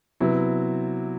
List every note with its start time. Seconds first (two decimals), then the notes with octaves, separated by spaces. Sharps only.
0.20 C3 F#3 B3 E4